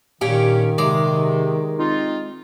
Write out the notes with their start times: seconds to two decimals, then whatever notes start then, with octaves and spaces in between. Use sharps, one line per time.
0.21 A#2 D#3 C#4 G4
0.78 C3 G#3 D5
1.77 C4 D#4 F4